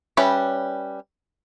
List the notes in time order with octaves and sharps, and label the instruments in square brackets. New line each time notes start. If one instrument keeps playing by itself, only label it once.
[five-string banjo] G3 C#4 B4 E5 G5